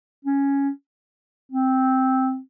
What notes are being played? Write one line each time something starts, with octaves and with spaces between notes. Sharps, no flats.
C#4
C4